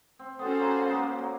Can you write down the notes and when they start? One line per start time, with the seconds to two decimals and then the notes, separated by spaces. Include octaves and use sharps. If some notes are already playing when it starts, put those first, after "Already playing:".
0.19 C4
0.39 B3 C#4 F#4 A4 C5
0.59 A#3
0.79 A#3
0.90 B3
0.99 A#3
1.19 F#3